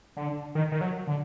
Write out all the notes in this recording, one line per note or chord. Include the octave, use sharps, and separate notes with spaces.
D3
D#3
D#3
F#3
D3